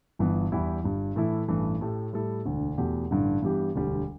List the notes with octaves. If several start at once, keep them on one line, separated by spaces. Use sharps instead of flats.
G1 G2 E3 B3
E2 E3 G3 E4 G4
G1 G2 G3
A2 E3 A3 E4
A1 G2 E3 A3
A2 A3 G4
A2 G3 E4 A4
E1 D2 D3
E2 B2 A3 G4
A1 G2 D3
G2 E3 G3 B3 G4
E1 D2 D3 G3